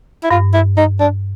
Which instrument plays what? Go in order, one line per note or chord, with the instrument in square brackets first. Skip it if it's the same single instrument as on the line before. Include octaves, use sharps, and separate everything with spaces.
[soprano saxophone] E4
[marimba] G2 [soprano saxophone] F4
[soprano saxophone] E4
D#4
D4